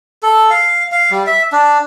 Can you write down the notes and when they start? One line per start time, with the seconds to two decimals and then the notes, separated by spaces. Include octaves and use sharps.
0.23 A4
0.50 F5
0.92 F5
1.11 G3
1.27 E5
1.52 D4